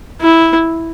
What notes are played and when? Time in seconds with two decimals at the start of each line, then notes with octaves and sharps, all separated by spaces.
0.21 E4